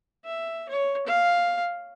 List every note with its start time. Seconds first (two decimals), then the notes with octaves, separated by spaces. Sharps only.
0.25 E5
0.69 C#5
1.07 F5